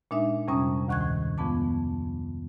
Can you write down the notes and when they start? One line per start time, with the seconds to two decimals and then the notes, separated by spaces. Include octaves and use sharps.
0.11 A#2 G#3 D4 D#4 E5
0.48 F2 C3 G3 C#4 A#5 D#6
0.88 D2 D#3 C#6 F#6 G#6
1.01 A2
1.38 F2 F3 G#3 B3 A5 D6